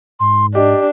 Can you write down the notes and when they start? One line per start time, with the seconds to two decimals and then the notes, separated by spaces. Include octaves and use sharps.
0.20 G#2 C6
0.55 D4 G4 D#5